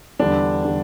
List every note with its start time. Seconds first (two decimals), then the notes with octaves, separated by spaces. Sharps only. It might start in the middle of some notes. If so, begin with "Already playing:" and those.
0.19 E2 D3 G3 D4
0.65 D3 G3